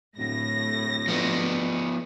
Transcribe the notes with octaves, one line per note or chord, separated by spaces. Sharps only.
D1 A2 A#6
F3 B3